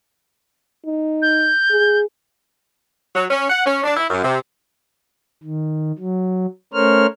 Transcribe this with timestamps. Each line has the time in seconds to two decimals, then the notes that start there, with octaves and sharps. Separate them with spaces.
0.86 D#4
1.22 G6
1.70 G#4
3.15 F#3
3.31 C#4
3.50 F#5
3.66 C#4
3.84 D4
3.97 E4
4.10 F#2
4.23 C3
5.43 D#3
5.98 F#3
6.74 A3 C#4 A#4 C5 C#5 F6